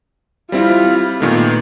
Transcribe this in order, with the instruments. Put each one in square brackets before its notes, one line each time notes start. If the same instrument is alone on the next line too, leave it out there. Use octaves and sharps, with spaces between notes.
[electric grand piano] G3 C4 E4 [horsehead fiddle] F4
[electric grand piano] A#2 D#3 A3 [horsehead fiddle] B3